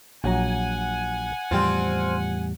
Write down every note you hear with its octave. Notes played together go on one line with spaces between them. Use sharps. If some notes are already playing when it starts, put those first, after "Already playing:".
A#1 F#3 F#5 G#5 A#5
E2 A2 F3 G3 C4 F4